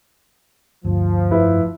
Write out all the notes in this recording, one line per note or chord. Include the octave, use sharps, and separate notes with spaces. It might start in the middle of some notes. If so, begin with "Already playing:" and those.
G1 D2 G2 F3
F1 F2 E4 B4